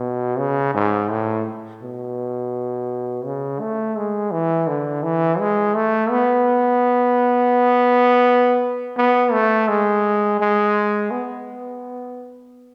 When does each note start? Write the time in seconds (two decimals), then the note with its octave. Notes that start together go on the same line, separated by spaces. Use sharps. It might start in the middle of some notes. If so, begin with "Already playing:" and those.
Already playing: B2
0.39 C#3
0.74 G#2
1.10 A2
1.82 B2
3.25 C#3
3.60 A3
3.97 G#3
4.32 E3
4.68 D3
5.03 E3
5.39 G#3
5.75 A3
6.10 B3
8.97 B3
9.33 A3
9.68 G#3
10.40 G#3
11.11 B3